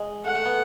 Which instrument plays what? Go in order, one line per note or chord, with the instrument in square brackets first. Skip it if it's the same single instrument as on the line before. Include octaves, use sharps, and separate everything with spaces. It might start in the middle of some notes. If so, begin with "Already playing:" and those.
Already playing: [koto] G#3
[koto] A3 [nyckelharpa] F#5
[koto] A3
B3